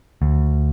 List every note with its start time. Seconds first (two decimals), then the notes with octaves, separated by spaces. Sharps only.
0.22 D2